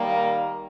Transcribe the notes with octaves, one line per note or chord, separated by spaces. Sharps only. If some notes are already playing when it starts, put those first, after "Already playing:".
Already playing: D#3 G3 A#3